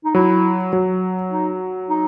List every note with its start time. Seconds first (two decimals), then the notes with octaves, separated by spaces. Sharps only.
0.05 D#4
0.15 F#3 E4
0.73 F#3
1.31 D#4
1.89 D#4